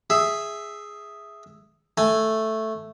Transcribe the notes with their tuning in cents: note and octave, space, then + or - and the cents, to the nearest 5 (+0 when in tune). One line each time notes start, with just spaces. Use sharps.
G#4 +0 E5 +0
A3 +0 G#5 +0